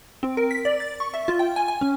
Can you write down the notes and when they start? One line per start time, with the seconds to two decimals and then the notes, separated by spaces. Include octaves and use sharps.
0.23 C4
0.37 A#4
0.51 B6
0.65 D5
0.80 A6
1.00 C#6
1.14 E5
1.28 F4
1.39 G5
1.56 G#5
1.68 G#5
1.81 C#4